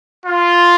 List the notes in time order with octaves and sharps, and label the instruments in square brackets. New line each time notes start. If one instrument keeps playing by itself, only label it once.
[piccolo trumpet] F4